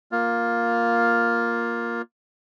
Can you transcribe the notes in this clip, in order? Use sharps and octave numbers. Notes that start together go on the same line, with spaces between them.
A#3 F4